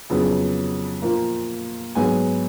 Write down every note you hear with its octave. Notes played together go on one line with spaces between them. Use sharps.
F2 C#3 F#3 B3
A#2 F3 A#3
G#2 F#3 B3 G#5